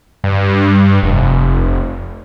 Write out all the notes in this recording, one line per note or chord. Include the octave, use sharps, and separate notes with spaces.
G2
F1